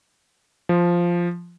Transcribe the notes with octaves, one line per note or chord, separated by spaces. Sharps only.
F3